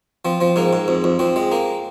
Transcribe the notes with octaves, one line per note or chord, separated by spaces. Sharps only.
F3 C4
F3 C4
G#2 A#3
G#2
F2
F2
F2 C4
G#3
A#3